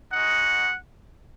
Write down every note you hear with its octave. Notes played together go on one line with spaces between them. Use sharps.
G#3 D#4 F#4 F#5